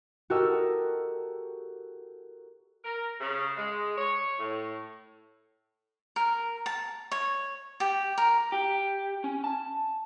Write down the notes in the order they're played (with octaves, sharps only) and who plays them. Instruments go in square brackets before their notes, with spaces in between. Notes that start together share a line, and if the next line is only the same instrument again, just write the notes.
[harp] F#4 G4 A4 A#4 D#5 E6
[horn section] A#4
C#3
G#3
C#5
A2
[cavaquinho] A#4
A5
C#5
G4
A#4
[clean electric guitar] G4
C#4
A5